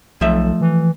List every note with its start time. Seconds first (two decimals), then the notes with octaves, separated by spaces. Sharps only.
0.21 B1 F3 A3 E5
0.61 E3